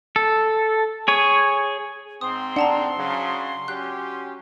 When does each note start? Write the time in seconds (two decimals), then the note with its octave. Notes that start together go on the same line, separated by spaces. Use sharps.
0.16 A4
1.08 G#4 C#5
2.21 G#2 C4 C6 D#6
2.56 D4 F#5 A5 A#5
2.97 C#3 F#3
3.68 F#3 C#4 G4 F#6